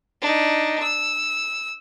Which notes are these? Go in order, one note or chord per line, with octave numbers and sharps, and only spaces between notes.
D4 D#4
E6